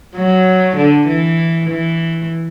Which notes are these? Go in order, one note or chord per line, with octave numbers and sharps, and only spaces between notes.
F#3
D3
E3
E3